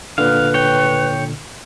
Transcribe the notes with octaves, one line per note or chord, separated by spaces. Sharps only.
A#2 D3 B4 F5
C#5 G5